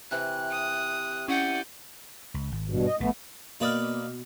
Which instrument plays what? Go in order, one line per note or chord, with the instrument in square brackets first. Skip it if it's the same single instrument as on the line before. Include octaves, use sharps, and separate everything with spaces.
[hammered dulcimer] C3 E3 [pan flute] F#6
[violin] D#6
[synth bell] C#4 E4 D#7 [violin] D5 G6 [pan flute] F#5
[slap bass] C#2
G#1
[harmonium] G2 B2
D#5
[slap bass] A#1 A2 [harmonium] A3 B3
[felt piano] B2 [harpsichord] A#3 B4 D5 [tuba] B3 [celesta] D#5 D#6 F6